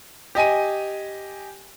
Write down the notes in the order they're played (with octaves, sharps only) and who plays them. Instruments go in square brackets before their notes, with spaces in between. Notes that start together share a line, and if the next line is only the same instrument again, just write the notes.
[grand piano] G4 D#5 G#5 D#7